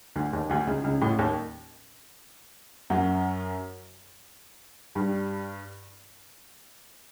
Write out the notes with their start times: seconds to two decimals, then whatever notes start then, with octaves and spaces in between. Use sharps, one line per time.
0.16 D2 D3
0.33 D#2 D#3
0.50 D2 D3
0.67 C#2 C#3
0.84 C#2 C#3
1.01 A1 A2
1.19 D#2 D#3
2.90 F#2 F#3
4.95 G2 G3